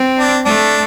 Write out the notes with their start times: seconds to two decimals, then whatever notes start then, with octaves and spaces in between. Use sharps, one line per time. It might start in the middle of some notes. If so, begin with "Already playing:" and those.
Already playing: C4
0.19 D4
0.46 A3 D4